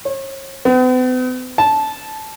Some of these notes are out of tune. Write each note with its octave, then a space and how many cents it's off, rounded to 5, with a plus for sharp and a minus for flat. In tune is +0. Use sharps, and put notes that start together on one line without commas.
C#5 -40
B3 +45
A5 -15